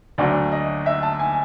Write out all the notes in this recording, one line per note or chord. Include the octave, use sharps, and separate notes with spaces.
D2 D3 F#3 A3 D5
D#5
E5
A5
G#5